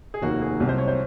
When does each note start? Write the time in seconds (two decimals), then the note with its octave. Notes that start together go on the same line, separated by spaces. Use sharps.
0.14 G#4
0.22 F1 D#2 D#3 A#3 F#4
0.42 G#4
0.60 C2 C3 F#3
0.69 C5
0.78 C#5
0.88 C5